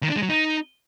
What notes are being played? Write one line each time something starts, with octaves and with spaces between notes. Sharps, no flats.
D#3
D4
G#3
F#3
D#4